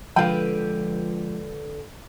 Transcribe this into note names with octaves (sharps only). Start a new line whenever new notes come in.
D3 F3 G#3 F4 B4 F5 G5